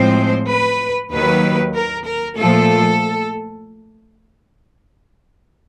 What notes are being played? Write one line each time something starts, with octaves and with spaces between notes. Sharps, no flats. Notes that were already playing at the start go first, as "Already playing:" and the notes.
Already playing: A2 F3 G#3 C4 C5
B4
D#2 D#3 F#3 A#3 B4
A#4
A#4
A#2 F3 A3 A4